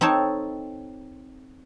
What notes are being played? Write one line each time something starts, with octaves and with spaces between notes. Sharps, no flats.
C4 D#4 A4 C#5 A5